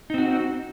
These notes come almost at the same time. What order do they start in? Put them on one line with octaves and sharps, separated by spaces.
D#4 C4 F#4